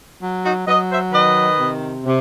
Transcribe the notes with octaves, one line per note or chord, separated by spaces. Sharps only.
F#3
D#4 F#4
F#3 B4 D#5
C5 E5
D#3 B4 D#5
C3
C3